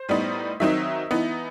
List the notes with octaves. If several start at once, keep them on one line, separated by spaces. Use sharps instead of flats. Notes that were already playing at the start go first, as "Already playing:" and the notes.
Already playing: C5
A2 G3 B3 D#4
D#3 F#3 C4 D#4 E5
E3 B3 D#4